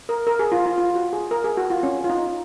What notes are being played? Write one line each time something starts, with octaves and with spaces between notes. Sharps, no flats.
A#4
A#4
G#4
F4
F4
F4
F#4
G#4
A#4
G#4
F#4
F4
C#4
F4
D#4